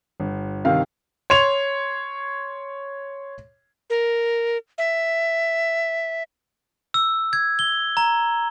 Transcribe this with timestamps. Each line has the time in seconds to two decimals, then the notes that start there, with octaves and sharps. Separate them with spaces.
0.20 G1
0.65 C3 D#3 F5
1.30 C#5 C6 F7
3.90 A#4
4.78 E5
6.94 E6
7.33 G#6
7.59 G7
7.97 A#5